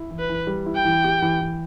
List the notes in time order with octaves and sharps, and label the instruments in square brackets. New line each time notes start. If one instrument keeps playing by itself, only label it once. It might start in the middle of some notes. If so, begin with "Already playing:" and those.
Already playing: [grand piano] E4
E3
[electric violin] B4
[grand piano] E3
G3
E4
[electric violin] G5
[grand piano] E3
G4
E3
E3